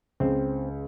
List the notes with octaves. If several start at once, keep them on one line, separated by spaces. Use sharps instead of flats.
C#2 C4